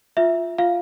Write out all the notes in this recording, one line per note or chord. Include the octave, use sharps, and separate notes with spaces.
F4 E5
F4 F5